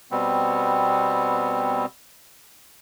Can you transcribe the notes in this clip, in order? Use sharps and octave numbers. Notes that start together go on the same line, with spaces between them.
B2 G3 B3 C4